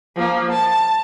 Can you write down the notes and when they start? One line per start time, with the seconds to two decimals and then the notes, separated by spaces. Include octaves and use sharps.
0.16 F3 A#3
0.51 A5